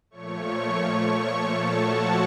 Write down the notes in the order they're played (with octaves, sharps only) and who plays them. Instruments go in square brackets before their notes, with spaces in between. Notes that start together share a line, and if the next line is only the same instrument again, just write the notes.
[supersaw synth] A#2 F3 A3 C#5 C#6
A4 A5
F#4 F#5